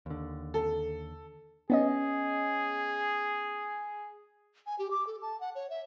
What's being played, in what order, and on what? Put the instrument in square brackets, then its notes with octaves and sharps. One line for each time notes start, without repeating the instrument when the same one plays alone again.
[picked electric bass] D#2 D3
[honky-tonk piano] A4
[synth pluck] B3 C#4 D#5 [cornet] G#4
[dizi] G#5
G4
D6
A4
A5
F#5
C#5
E5